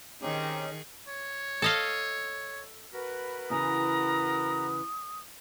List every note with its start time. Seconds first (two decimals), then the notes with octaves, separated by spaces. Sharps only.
0.22 D#3 C4 C#4 D#4 G4 G#4
1.08 C#5
1.62 A4 D#5 F5
2.93 F#4 A#4 B4
3.50 E2 C#3 A#5 D#6